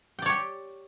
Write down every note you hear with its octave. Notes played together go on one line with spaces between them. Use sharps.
G4 C#5 D5 G5